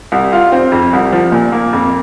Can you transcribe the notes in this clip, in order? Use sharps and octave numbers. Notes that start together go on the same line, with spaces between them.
C2
F4
C4
F2
C2
F3
A#2
A#3
F2